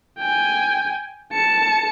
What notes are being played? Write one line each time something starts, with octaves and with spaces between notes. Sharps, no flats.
G5 G#5
A5 C#7